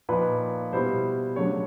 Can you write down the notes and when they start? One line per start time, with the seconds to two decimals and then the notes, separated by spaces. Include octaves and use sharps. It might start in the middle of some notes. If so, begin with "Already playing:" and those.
0.09 A#2 F3 A#3 D#4 B4
0.73 B2 G3 B3 E4 C5
1.36 C#3 F#3 A3 D4 C#5